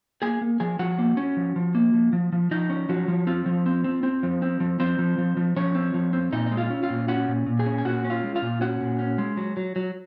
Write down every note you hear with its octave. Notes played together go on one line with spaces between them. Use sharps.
A#3 G#4 G#5
A#3
F3 G#4 G#5
F3 F#4 F#5
A#3
C#4
F3
F3
A#3
F3
F3
F3
F3 D#4 D#5
C#4
F3 F#3 F#4
F3
C4 F4
F3
C4
C4
C4
F3
C4
F3
F3 C4 C5
F3
F3
F3
F3 C#4 C#5
C4
F3
C4
A#2 D#4 D#5
G#3 D#5
F4 F5
C#4
F4 F5
A#2
C#4 F#4 F#5
A#2
A#2
G#4 G#5
C#4
G#5
A#2 F#4 F#5
C#4
F4 F5
G#3
F4 F5
A#2
C#4 F#4 F#5
A#2
C#4
G#3
F#3
F#3
F#3